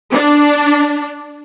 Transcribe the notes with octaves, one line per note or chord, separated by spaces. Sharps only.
D4